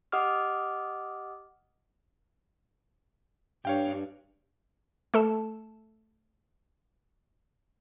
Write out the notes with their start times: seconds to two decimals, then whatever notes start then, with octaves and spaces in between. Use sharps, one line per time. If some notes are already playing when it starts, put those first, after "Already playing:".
0.12 G4 D#5 F#5 D6 D#6 F6
3.65 G2 C#5 F5 G5
5.14 A3 A4 A5